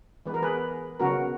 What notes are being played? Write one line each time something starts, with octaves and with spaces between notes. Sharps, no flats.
E3 G#3 B3 B4
A#4
G#4 B4
C#3 F#3 B3 F#4 A#4